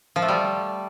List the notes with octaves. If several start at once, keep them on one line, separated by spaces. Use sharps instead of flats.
F3
A3
G3